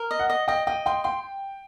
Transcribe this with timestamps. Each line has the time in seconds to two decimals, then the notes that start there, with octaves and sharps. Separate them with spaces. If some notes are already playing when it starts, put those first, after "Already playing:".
Already playing: A#4
0.11 D#5
0.19 F#5
0.30 D#5
0.48 D#5 G5
0.67 D#5 G5
0.86 G5 C6
1.04 G5 C6